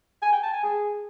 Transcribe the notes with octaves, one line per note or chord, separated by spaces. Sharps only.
G#5
G5
A5
G#5
G#4